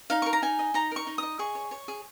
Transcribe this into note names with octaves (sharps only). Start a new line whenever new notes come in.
D#4 F5
A#4 C#6
A#5
D#4 G#5
D#5
D#4 A#5
A#4 C#6
D#4
D#5 D#6
G#4 C#6
C#5
C#5
G#4